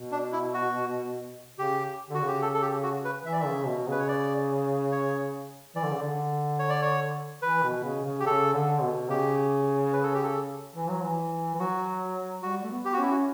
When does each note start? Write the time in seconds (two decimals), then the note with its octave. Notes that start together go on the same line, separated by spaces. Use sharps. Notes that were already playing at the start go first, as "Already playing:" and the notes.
Already playing: B2
0.12 D4
0.33 E4
0.54 F#4
1.58 C#3 G4
2.10 D3 F#4
2.21 C#3
2.28 G4
2.42 A4
2.54 A4
2.62 G4
2.83 F#4
3.05 B4
3.25 E3 E5
3.32 D5
3.40 E5
3.46 C#3
3.67 B2
3.88 C#3 B4
3.99 C#5
4.08 D5
4.92 C#5
5.75 E3 D5
5.84 D3
5.91 C#3
6.00 D3
6.59 C#5
6.70 D5
6.82 C#5
7.42 E3 B4
7.64 B2
7.84 C#3
8.05 C#3
8.20 G4
8.26 C#3 A4
8.54 D3
8.82 B2
9.09 C#3 G4
9.93 B4
10.03 A4
10.14 G4
10.24 A4
10.76 E3
10.90 F#3
11.03 E3
11.55 E3
11.60 F#3 F#4
12.43 G3 F#4
12.63 A3
12.71 B3
12.85 G4
12.93 F#4
12.99 C#4 E4
13.11 F#4